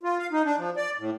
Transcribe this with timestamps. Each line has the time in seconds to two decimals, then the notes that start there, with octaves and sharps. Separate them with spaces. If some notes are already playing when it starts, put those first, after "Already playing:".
0.03 F4
0.19 F5
0.32 D#4
0.45 D4
0.58 F3
0.76 D5
0.98 A2